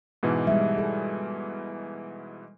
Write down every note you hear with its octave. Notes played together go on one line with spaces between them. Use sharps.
G#2 B2 E3
G3 G#3 E5
E4 G#4 A4